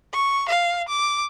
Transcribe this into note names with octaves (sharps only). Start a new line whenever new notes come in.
C#6
F5
D6